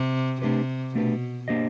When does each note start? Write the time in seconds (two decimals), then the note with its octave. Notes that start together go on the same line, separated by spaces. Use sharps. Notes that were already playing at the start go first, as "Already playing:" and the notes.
Already playing: C3
0.42 C3 A3 D4 G4 B4
0.95 B2 A3 D4 G4 B4
1.48 A#3 D4 G4 C5 D#5